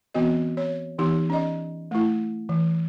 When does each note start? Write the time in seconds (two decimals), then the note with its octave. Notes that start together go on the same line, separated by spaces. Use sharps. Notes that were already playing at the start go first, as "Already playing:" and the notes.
0.14 E3 B3 C4 F#4 D#5
0.57 C#5
0.99 E3 B3 D#4 G4
1.30 C#4 D5 D#5
1.91 A3 E4
2.49 E3